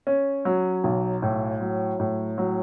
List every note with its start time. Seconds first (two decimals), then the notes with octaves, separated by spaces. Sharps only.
0.07 C#4
0.45 F#3
0.84 B1
1.22 A2
1.61 F#3
2.00 A2
2.38 F#3